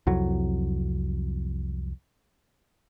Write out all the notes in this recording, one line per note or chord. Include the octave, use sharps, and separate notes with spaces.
C2 F2 F#3